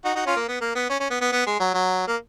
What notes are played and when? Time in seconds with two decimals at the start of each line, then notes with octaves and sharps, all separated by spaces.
0.05 D#4 F#4
0.15 D#4 F#4
0.26 C#4 F4
0.36 A#3
0.48 B3
0.61 A#3
0.75 B3
0.89 C#4
1.00 C#4
1.10 B3
1.21 B3
1.32 B3
1.47 G#3
1.60 F#3
1.74 F#3
2.07 A#3